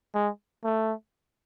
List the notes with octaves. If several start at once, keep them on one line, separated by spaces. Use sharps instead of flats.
G#3
A3